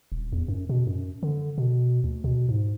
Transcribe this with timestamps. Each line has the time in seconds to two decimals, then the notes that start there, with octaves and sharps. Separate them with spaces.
0.12 D#1
0.32 E2
0.48 F#2
0.69 B2
0.87 F#2
1.23 D3
1.58 B2
2.04 D2
2.24 B2
2.49 G#2